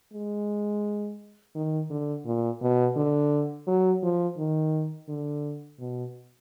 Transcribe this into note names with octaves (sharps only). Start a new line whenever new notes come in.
G#3
D#3
D3
A#2
B2
D3
F#3
F3
D#3
D3
B2